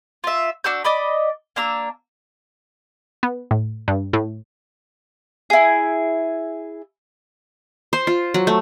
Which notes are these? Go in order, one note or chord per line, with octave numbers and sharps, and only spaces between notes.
F4 E5
D4 F#4 E6 G6
D5 D#5 B5
A#3 D4 A#5 E6
B3
A2
G2
A2
E4 G#4
C5
F4
F#3
A3